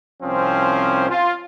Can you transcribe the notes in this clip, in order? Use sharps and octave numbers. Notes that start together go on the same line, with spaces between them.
C2 F3 C4 C#4 C5
F4